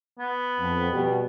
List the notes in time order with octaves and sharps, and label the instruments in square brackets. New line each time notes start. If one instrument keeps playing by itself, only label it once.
[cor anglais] B3
[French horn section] F2
B2 G3